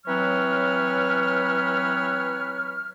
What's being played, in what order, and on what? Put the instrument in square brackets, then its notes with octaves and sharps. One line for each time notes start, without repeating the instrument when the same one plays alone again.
[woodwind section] E3 F#3 C4 B4 C#5 F6